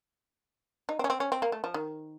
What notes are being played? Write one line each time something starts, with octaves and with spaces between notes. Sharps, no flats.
D#4
C4
C#4
C4
C#4
C4
A#3
A3
F3
D#3